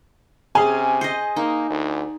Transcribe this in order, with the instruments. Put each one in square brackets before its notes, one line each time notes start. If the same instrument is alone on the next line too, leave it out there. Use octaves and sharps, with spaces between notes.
[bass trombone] C3 [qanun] C#4 [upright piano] G#4 G#5
[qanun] C5 D#5
[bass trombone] A#3 [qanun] D#4
[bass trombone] D2